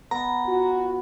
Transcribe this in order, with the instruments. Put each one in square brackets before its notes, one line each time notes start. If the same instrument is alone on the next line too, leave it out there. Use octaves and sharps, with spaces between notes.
[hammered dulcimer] B3 [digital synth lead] A#5
[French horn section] F4 F#4